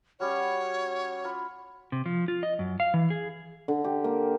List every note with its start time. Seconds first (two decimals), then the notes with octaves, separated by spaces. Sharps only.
0.20 G3 C#4 F#4 C#5
1.24 F4 B5
1.92 C3
2.06 F3
2.28 F4
2.43 D#5
2.59 F#2
2.80 F5
2.94 E3
3.10 G#4
3.68 D3
3.84 G4
4.04 A#3